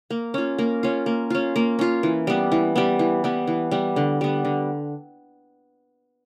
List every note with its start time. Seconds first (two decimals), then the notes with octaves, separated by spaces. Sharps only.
0.10 A#3
0.34 C#4 F4
0.58 A#3
0.83 C#4 F4
1.06 A#3
1.30 C#4 F4
1.56 A#3
1.79 C#4 F4
2.03 E3
2.27 G3 B3
2.52 E3
2.76 G3 B3
2.99 E3
3.24 G3 B3
3.47 E3
3.71 G3 B3
3.96 D3
4.21 G3 B3
4.45 D3